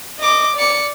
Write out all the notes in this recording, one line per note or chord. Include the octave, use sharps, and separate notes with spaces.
D#5 D6
D5 C#7